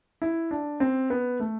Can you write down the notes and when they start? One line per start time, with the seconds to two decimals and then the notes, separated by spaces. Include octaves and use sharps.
0.22 E4
0.51 D4
0.80 C4
1.10 B3
1.40 A3